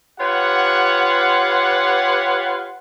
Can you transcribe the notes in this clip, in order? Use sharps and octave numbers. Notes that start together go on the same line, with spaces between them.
F4 G4 B4 C#5 F#5